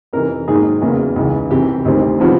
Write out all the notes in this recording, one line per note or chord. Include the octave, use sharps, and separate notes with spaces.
F2 C3 E3 A#4
G#2 D#3 F#3 A#3 G#4
E2 C#3 F#3 A#3
C#2 C#3 E3
C2 C3 E3 G4
D2 C3 D#3 G3 C4
C3 F3 G#3 B3